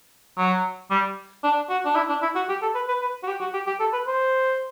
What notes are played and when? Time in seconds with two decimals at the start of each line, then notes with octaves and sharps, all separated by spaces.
0.38 F#3
0.91 G3
1.44 D4
1.70 F#4
1.85 D4
1.96 E4
2.09 D4
2.22 E4
2.35 F#4
2.49 G4
2.62 A4
2.75 B4
2.88 B4
3.01 B4
3.23 F#4
3.27 G4
3.40 F#4
3.53 G4
3.66 G4
3.80 A4
3.93 B4
4.07 C5